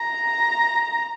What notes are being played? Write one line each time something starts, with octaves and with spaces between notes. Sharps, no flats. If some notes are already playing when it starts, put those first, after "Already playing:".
Already playing: A#5